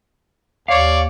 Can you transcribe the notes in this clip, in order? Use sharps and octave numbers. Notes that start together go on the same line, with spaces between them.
D#2 C#5 D5 F5